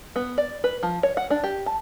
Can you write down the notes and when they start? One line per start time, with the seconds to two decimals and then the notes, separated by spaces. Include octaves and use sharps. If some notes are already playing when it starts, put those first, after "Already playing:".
0.16 B3
0.38 D5
0.64 B4
0.83 F3
1.03 C#5
1.17 F#5
1.30 D4
1.44 G4
1.66 A5